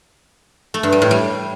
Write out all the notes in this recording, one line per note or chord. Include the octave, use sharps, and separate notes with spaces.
A3
G2
G3
A2
G3